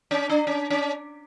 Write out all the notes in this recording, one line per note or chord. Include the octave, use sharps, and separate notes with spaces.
C#4
D4
C#4
C#4